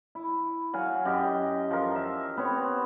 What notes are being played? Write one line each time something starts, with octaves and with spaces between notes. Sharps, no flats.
E4
F#3 F5 G#5
F#2 G4 D#5
F3 A#4
E5
B3 C4 C#5